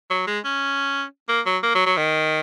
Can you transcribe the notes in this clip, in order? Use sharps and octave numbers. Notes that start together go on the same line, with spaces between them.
F#3
G#3
C#4
A#3
F#3
A#3
F#3
F#3
D#3